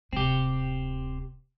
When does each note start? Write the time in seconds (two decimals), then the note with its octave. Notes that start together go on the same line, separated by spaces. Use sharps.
0.13 D1 C3 C4 G4